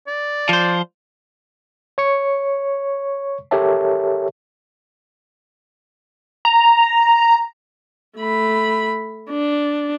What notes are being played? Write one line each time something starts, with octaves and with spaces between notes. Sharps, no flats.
D5
F3 C5
C#5 C#6 C#7
G4 A4 A#4 C#5 E5 A5
A#5
A3 B5
D4